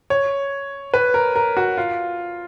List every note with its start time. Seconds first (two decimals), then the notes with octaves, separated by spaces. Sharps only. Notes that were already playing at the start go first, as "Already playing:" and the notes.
0.10 C#5
0.94 B4
1.14 A#4
1.36 A#4
1.57 F#4
1.78 F4